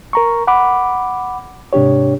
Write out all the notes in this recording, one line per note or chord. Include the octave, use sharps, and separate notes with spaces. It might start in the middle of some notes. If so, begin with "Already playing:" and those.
A#4 A#5 C#6
F#5 B5 D6
G#2 C3 D4 G4 C#5